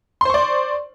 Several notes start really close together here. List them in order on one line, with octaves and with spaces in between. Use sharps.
C6 C5 C#6 D5